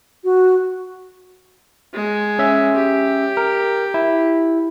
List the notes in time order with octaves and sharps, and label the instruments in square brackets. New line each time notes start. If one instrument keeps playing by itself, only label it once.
[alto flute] F#4
[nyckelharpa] G#3
[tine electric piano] C#4 E5
[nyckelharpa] G4
[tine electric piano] A#4
E4